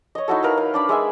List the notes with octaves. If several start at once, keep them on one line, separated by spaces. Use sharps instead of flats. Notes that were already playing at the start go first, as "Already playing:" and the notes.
C#5 D#5
D#4 E4 F#4 A4
A#4 B4 F5
F5
D4 D5 B5
G#3 E5 G#5